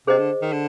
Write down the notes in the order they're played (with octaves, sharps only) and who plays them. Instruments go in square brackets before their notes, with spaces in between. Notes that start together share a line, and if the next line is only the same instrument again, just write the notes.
[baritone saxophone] C3 [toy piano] G#4 C5 D#5
[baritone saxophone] D3
D#3
D3